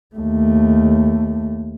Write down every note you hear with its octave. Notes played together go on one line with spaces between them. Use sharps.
D#2 A3